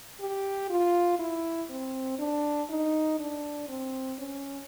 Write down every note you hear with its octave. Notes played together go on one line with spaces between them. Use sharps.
G4
F4
E4
C4
D4
D#4
D4
C4
C#4